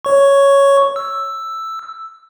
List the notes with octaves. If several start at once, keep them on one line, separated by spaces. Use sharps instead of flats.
C#5 C#6
E6